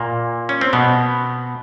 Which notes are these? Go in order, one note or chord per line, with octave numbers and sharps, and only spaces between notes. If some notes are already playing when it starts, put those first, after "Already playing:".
Already playing: A#2 A#3
C#4
C4
B2 B3